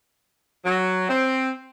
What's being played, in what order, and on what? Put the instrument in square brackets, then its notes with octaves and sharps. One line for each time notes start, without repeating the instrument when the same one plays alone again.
[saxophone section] F#3
C4